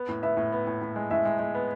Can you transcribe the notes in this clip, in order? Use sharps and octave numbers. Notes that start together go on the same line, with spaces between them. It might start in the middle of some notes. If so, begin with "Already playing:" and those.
Already playing: B3
A2
B3 E5
A2
B3
A2
A2
G#3
A2 E5
G#3
G#3
B3